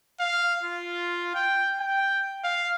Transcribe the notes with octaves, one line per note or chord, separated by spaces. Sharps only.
F5
F4
G5
G5
F5